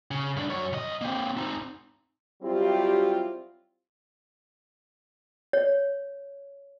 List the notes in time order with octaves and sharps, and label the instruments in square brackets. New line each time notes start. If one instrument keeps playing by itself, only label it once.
[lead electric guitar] C#3
G2 D4
F#2 C#5
C2 D#5
A#3 C4
C4 D#4
[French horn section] F#3 G3 C4 E4 F4 G4
[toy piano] C#5